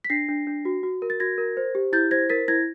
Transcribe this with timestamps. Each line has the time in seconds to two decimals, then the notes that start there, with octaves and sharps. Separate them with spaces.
0.04 B6
0.10 D4 A#6 C7
0.28 D4
0.47 D4
0.65 F#4
0.83 F#4
1.02 A#4
1.10 A6
1.20 F#4 G#6 A#6
1.38 A#4
1.57 C5
1.75 G4
1.93 E4 G6 A6
2.11 C5 G#6 A#6
2.30 A#4 A6 B6
2.48 E4 G#6 A#6